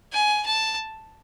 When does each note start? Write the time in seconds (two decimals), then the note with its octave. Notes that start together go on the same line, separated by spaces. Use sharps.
0.12 G#5
0.46 A5